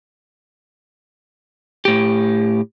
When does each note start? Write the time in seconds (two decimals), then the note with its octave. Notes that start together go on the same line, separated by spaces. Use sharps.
1.85 A2 G4